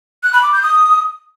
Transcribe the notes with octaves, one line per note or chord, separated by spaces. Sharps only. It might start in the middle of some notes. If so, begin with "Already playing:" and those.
F#6
B5
D6
G6
D#6